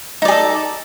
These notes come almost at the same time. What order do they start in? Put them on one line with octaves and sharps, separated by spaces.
D#4 D5 G#4 A4